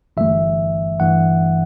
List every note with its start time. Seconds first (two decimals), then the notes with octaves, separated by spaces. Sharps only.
0.17 G1 G2 E3 A3 E5
1.00 G1 G2 E3 A3 F#5